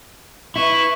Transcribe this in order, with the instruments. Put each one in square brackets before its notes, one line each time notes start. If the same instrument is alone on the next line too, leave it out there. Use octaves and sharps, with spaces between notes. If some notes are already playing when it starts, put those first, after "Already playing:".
[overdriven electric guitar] E4 [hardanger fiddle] B4 C#6